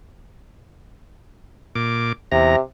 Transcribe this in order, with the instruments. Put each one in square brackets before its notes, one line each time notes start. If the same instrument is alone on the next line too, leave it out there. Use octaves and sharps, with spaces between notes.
[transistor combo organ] A#2 D6
[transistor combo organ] E2 A#5 [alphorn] C3